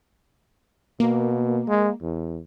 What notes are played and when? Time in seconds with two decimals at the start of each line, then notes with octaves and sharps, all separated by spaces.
1.00 B2 A#3
1.69 G#3
2.02 E2